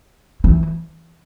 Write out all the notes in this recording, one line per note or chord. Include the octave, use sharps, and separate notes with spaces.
E3